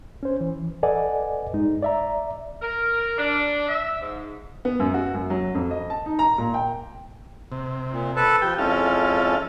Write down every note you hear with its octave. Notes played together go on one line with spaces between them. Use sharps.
C#4 C5
E3
A4 B4 D5 D#5 F#5 G#5
G2 G#3 D#4
D5 E5 A#5
A#4
D4
E5
G#2
B3
F#2
F#4
F#2
F#3
F2
D#5
A5
D#4
A#5
A#2
G5
C3
A#2
A4 B4 A5
F3 G4 G5
F2 G#3 C#4 E4 A4 F5